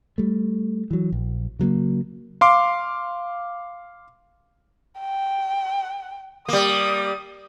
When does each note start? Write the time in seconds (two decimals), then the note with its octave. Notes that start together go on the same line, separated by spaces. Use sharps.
0.18 G3 A3
0.91 E3 F#3
1.12 A#1
1.59 C#3 F#3 G#3 A#3
2.41 F5 C6 D6
5.00 G5
6.49 G3 A#3 D#6